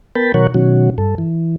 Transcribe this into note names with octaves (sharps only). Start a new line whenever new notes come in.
B3 A#4 G5 A5 B5
B2 D#3 F#3 A#4 C#5 F#5
B2 D#3 F#3 C#4 F#4
G2 A4
E3